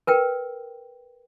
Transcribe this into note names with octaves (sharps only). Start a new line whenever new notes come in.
A#4 B4 G5